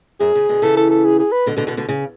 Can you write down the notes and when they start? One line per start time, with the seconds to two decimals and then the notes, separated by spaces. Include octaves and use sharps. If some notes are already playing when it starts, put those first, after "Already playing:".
0.20 F#2 G#4
0.35 C#3
0.49 B2 D3
0.62 C#3 E3 A4
0.77 A4
0.90 A4
1.05 G#4
1.19 G#4
1.32 B4
1.46 B2 D3
1.57 B2 D3
1.67 B2 D3
1.77 B2 D3
1.88 C#3